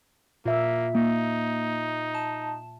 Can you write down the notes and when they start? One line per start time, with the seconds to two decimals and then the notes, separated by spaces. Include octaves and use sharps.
0.46 A#2 A#3 E5
0.95 A#3 D#4
2.15 A5